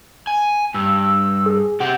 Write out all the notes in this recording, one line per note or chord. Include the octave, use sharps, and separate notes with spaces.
G#5
G2 E6
E6
G#4
C3 G4 F#5